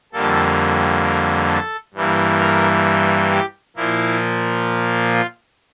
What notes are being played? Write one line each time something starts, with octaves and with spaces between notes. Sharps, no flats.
F2 D3 G3 A#3 A4
A#4
A4
G2 E3 G3 A#3
A#4
G4
A#2 F3 A#3 E4
F4